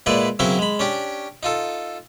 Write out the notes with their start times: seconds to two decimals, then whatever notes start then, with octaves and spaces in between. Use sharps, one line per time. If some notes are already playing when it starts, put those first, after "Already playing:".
0.06 A#2 G#3 E4 B4 D5
0.39 C#3 F#3 B3 C4 E4 A#4
0.59 G#3 B5
0.79 C#4 D4 G4
1.43 D#4 F4 A4